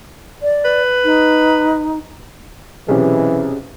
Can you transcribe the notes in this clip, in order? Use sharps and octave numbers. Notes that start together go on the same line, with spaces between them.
D5
B4
D#4
B1 C3 E3 C#4 G4 G#4